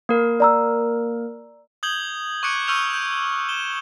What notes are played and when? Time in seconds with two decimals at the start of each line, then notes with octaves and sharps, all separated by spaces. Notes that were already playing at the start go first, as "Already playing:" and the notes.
0.09 A#3 A#4
0.40 D5 A#5 E6
1.83 D#6 G6 G#6 F#7 G7
2.43 C#6 D6 F#6 G#6 C#7 D7
2.68 C#6 E6 F6 G6 F7
2.93 G6
3.49 E7 G7